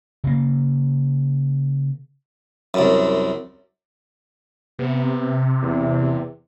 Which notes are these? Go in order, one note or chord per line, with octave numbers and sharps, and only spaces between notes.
C#3 A#3
C2 F#2
C3 B3
E2